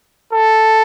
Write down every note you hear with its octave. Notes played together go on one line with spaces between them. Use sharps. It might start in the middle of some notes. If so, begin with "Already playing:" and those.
A4